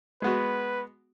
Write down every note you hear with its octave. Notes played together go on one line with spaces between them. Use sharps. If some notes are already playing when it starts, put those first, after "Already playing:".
G#3 B3 F#4 B4